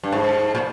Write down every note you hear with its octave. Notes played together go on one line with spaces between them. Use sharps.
G2
G#2
A#2